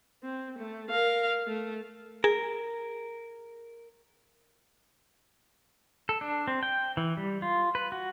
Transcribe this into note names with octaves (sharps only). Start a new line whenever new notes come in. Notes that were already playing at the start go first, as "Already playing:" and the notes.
C4
A3
A#4 F5
A3
G#4 A#4
A4
D4
C4
G5
E3
G3
F4
B4
F#4